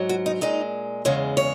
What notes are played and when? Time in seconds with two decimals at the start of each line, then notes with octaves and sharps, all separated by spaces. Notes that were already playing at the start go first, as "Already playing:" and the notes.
Already playing: G#2 F#3
0.09 F#4
0.26 D#4
0.41 A#2 G#3 D#4
1.05 E2 C#3 G#3 C#5
1.37 C#5